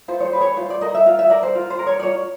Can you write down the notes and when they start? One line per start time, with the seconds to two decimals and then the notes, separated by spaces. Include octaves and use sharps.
0.08 F4 C5
0.20 C#5
0.25 C5
0.33 G#4 B4
0.41 C#5
0.57 F4 C5
0.70 D5
0.81 A#4 D#5
0.95 E5
1.06 F4 F5
1.19 E5
1.30 A#4 D5
1.43 C5
1.55 F4
1.70 C5
1.79 A#4
1.87 C#5
2.00 D5
2.03 F4 C#5